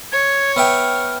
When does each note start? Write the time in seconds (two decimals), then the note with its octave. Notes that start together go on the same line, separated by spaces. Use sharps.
0.12 C#5 G#6
0.56 B3 E5 G5 F6